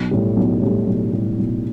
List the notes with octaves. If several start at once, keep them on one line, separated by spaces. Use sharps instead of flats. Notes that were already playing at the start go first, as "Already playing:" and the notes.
Already playing: B1
A2 G3
B1
A2 G3
B1
A2 G3
B1